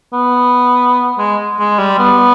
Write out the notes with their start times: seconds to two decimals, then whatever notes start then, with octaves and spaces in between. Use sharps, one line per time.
0.13 B3
1.19 G#3
1.59 G#3
1.79 G3
1.99 B3